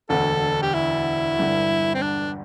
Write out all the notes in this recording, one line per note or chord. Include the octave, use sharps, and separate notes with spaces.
E1 D2 D3 A4
G4
E4
G1 G2 D3
C4
D4